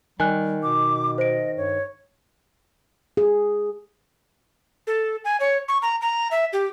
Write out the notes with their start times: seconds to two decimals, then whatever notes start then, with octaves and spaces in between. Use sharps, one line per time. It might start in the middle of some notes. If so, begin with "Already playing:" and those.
0.20 D#3 G3 G#5 F#6
0.63 B2 D6
1.18 C5 D#5 D7
1.57 G2 C#5
3.17 G#4
4.87 A4
5.25 G#5
5.40 C#5
5.68 C#6
5.82 A#5
6.01 A#5
6.31 E5
6.53 G4